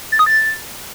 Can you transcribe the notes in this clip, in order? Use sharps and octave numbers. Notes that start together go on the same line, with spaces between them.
A6
D#6
A6